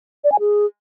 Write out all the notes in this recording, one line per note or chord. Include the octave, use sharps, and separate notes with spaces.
D5
G#5
G#4